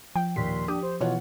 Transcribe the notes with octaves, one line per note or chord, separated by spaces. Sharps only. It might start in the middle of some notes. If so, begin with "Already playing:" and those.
F3 G5
D#2 A#2 C6 B6
D4 G4 D#6
C5
B2 E3 F4 C#5 F#5